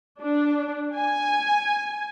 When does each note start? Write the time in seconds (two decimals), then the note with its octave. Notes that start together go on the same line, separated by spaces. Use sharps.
0.22 D4
0.94 G#5